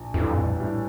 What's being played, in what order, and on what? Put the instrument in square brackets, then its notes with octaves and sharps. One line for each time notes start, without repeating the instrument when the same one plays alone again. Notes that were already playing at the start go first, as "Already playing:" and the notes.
Already playing: [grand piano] A#1
[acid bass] F2 [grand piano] A2 E3 G3 D4
[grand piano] A#1
A2 E3 G3 D4